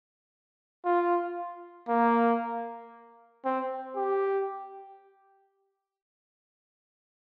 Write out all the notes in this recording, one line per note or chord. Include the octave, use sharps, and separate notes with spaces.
F4
A#3
C4
G4